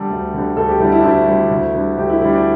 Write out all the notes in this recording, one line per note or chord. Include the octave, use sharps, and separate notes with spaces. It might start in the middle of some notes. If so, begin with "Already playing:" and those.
Already playing: D3 G3 A4
D2
D3 G3
D2 A4
G4
D3 G3 E4
E4
D4
D2 E4
D3 G3
D2
D3 G3
D2 G4
E4
D3 G3 E4
D4